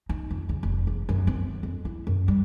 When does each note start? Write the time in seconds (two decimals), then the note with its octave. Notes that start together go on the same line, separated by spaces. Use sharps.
0.09 D#4
0.30 F2
0.49 C#3
0.63 F1
0.87 E2
1.09 F#2
1.27 C4
1.63 F2
1.85 E4
2.07 F#2
2.28 G3